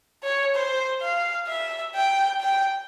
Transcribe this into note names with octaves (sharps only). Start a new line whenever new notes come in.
C#5
C5
F5
E5
G5
G5